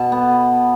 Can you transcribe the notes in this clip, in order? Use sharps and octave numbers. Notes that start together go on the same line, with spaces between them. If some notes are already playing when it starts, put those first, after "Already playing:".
Already playing: B2 A5
B3